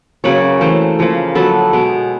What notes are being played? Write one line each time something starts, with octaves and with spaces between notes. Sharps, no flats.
C#3 F#3 A#3 B4 C#5
E3 A3 A#4 C5
C#3 F3 A#3
D3 F#3 B3 A4 B4
B2 G#3 B3